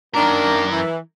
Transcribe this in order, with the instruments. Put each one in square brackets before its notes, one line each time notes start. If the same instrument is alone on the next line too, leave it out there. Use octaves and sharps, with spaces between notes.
[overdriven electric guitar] F#2 A#4 [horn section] D#3 A#3 D4
[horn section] E3